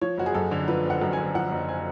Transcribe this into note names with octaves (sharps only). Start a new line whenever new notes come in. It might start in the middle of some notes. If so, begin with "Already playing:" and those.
F3 C#5
F#1 F#4
G#4
F#2 A4
D3
F3 B4
F#1 F#5
F#2
G#5
D3
F3 F#5
F#1
G#5